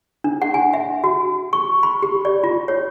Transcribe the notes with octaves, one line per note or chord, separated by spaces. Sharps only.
D4
F#5
G#5
E5
F#4
C#6
B5
G4
D5
F4
C#5